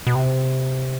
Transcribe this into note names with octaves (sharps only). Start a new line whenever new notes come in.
B2
C3